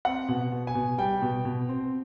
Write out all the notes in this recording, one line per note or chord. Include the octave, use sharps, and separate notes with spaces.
C4 F#5
B2
B2
G#5
B2
G3 G5
B2
B2
C4